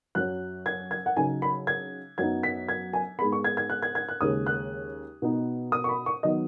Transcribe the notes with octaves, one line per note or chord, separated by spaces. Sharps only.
F#2 F#3 C#4 F#6
G#6
G#6
F#5
C#3 F#3 D#4 G#5
B5
G#6
F#2 F#3 B3 D#4 G#6
B6
G#6
G#5
G#2 G#3 B3 B5
C#6
G#6
G#6
F#6
G#6
G#6
F#6
D#2 C#3 G#3 D#6
F#6
B2 B3 D#4
D#6
C#6
B5
C#6
D#3 F#3 B3 D#5